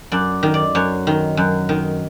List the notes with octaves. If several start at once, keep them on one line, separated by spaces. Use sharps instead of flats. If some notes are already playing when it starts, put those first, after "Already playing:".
F#2 D5
D#3
D5
F#2 C#5
D#3
F#2
D#3